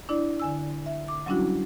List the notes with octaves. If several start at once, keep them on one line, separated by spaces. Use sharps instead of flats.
D4 E4 D5
D3 G#5 E6
E5
D6
F#3 G3 C#4 D4 E4 F#4